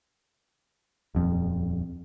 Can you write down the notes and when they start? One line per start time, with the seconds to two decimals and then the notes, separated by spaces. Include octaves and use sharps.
1.15 D#1 F2